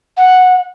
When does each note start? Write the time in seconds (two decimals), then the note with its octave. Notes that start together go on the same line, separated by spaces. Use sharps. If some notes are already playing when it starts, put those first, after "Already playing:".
0.17 F#5